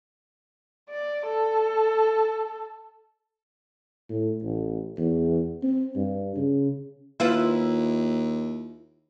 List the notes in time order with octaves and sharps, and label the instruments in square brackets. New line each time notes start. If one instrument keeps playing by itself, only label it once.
[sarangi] D5
A4
[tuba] A2
A1
E2
C4
G2
C#3
[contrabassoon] D#2 [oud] E4 F4 B4